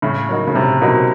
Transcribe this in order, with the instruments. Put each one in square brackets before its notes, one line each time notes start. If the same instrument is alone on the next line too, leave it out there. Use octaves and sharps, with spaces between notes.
[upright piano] A2 [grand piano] C#3
[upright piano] F#3 A#3 D#4 F#4
[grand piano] C#3
[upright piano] A2 [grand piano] C3
[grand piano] B2 [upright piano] F#3 A#3 D#4 F#4